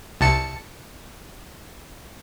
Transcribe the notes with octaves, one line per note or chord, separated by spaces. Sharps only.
C2 A5 C#7